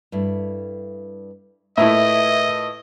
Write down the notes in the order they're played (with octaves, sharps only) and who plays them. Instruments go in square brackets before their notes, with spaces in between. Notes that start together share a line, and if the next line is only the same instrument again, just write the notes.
[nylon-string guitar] G2 A3 E4
[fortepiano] A2 A3 E4 [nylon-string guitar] F4 A#4 B4 [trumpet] D#5 [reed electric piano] E5